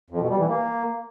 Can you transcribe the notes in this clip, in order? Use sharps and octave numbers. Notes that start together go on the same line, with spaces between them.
F2
B2
G3
E3
A#3